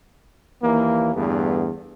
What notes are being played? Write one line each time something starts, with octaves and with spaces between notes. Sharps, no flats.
D#2 E3 A#3
E2 G2 D3 A3 B3